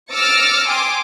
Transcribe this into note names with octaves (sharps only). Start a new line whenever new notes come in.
D6 E6 F6 A6 A#6 C#7
G5 G#5 C6 D6 D#6